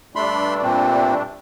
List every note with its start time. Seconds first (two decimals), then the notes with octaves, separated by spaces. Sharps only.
0.16 G2 A3 D4 B5 C6
0.63 A#2 C4